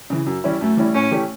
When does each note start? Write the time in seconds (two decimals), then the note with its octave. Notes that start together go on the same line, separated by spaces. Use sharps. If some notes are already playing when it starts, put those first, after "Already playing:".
0.10 C#3 E3
0.26 F#2
0.44 E3 G3 C#4 E4
0.61 F#2 A3
0.77 E3 G3 C#4 E4
0.94 A2 C#4
1.11 E3 A3 C#4 G4